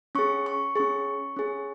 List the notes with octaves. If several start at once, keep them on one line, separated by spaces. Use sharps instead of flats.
C#4 G#4 C#6
C#6
C#4 G#4 C#6
C#4 G#4